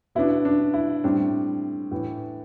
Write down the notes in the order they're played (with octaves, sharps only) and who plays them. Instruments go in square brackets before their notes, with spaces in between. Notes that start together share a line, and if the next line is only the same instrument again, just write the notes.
[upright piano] B2 B3 D4 E4
D4
E4
A2 G3 C4 D4
A2 E3 B3